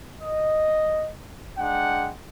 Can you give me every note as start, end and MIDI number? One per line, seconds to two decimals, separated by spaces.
0.22 1.08 75
1.59 2.11 56
1.59 2.11 62
1.59 2.11 78
1.59 2.11 79